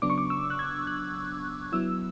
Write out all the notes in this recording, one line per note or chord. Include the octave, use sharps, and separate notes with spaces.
C#3 F#3 B3 D4 D6
C#6
D6
E6
F#6
G#6
F#6
F#3 B3 E4 E6